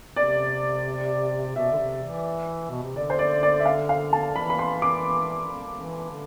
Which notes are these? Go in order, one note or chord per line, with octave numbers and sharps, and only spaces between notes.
C3 D5
B2 E5
D3
C3
E3
B2
C3
D3 D5
C5
D5
D5
E5
F5
F5
A5
E3 B5
B5
C6
D6
E3
D3